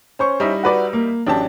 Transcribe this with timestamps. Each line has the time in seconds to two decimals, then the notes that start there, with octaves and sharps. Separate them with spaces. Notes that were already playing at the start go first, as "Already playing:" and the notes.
0.19 C#4 C5 C#6
0.40 G3 D#4 E4
0.63 F#4 B4 D5
0.93 A#3
1.26 A1 F#3 D4 G4 A5